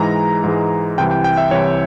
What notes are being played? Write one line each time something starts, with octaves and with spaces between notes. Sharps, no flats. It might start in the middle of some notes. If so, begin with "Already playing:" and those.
Already playing: G#2 E3 G#3 A#5
G#2 E3 G#3
C2 C3 E3 G5
G5
G5
E5
C2 C3 E3 C#5